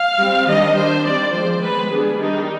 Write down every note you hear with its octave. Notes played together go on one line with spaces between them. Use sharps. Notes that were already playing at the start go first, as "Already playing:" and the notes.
Already playing: F5
G3 C4
D#3 G3 D4 D#5
G3 D4 C5
D#3 G3 C4 D5
F3 G#3 C4 C5
D#3 G#3 B3 B4
G3 B3 D4 G#4
D#3 G3 D4 D#4